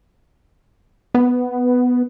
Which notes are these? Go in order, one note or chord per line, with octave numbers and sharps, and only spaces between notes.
B3